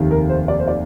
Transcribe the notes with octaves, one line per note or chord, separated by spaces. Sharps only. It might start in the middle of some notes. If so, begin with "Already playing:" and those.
Already playing: F1 D#2 D#3
A#4
C5
D5
C5
D5